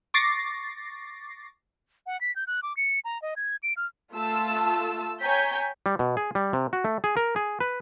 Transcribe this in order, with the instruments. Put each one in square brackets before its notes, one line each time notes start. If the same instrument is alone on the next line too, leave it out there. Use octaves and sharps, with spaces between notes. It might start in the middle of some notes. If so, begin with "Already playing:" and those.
[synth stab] C#6 D6 A6 A#6 C7
[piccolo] F#5
B6
G6
F#6
D6
C#7
A#5
D#5
G#6
D7
F6
[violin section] A3 F4 A5 E6
C#5 G5 G#5 A#5 G6 B6
[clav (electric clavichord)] G3
B2
G#4
G3
C3
F#4
A3
G#4
A#4
G#4
B4